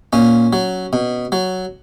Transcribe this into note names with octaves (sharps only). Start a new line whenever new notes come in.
A#2 C#4
F#3
B2
F#3